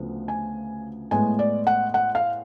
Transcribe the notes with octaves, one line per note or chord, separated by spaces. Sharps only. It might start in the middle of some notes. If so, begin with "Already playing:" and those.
Already playing: D2 C#3 F3 B3
G#5
A2 G#3 B3 G#5
D5
F#5
F#5
F5